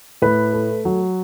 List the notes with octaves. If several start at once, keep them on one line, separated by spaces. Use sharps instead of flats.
A2 B4
A3
F#3